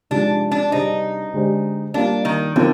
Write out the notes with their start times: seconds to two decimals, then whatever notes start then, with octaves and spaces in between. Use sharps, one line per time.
0.11 C3 F3 G#3 D4 D#4
0.51 D4
0.71 C3 G3 D4 D#4 G#4 C5
1.34 D3 G#3 D4 G4 C5
1.94 G3 A#3 D4 F4
2.25 D#3
2.56 D3 F3 C4 D#4 A#4